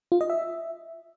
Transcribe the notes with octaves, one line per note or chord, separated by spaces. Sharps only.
F4
D#5
E5